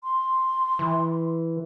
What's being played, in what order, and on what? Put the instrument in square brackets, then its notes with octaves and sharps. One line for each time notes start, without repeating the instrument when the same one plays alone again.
[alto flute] C6
[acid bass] E3